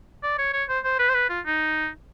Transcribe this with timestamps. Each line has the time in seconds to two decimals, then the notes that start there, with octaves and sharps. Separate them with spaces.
0.23 D5
0.38 C#5
0.53 C#5
0.69 C5
0.84 C5
0.99 B4
1.09 C5
1.14 B4
1.29 F4
1.46 D#4